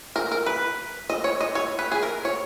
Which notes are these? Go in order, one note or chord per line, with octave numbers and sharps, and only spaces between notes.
A#4
A#4
B4
D#5
C#5
D#5
C#5
B4
G#4
A#4
C#5